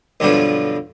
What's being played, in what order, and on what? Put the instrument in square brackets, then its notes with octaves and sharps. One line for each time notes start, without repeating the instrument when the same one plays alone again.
[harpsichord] B1 G2 D3 F3